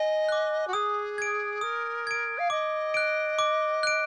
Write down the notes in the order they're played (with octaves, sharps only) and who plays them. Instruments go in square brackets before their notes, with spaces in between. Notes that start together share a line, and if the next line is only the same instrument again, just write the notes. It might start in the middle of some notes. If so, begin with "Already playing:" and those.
Already playing: [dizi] D#5 [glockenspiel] G#5
[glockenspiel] D6 F#6
[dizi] F#4
[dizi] G#4 [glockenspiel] D#6
[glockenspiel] G#6 D7
[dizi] A#4 [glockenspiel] D#6
[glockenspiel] G#6 D7
[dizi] F5
[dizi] D#5 [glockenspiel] D6
[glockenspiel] F#6 D7
D6
F#6 D7